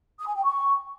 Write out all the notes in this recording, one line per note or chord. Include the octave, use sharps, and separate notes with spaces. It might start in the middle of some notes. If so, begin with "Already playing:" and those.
D#6
G#5
G5
C#6